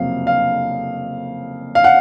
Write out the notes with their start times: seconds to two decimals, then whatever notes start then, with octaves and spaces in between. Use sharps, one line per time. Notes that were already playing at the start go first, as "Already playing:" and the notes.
Already playing: F#1 F2 C3 F#3 F5
0.27 F5
1.75 F5
1.84 F#5